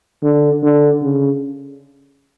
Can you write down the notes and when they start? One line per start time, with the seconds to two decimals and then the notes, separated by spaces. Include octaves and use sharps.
0.23 D3
0.63 D3
1.02 C#3